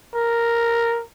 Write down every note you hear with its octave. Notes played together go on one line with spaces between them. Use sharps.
A#4